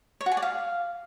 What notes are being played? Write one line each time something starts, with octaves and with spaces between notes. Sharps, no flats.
C#5
F#4
G#5
D5
F5